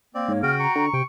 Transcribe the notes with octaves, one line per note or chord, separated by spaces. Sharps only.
A#3 C4 D5
G#2 C#5
C#3 F#4 G5 F6
A#5 C#6
D3
C3 G5